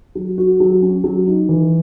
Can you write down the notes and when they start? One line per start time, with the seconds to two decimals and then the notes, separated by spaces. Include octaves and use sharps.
0.15 F#3
0.38 F#4
0.60 F#3
0.82 C#4
1.04 F#3
1.27 D#4
1.49 E3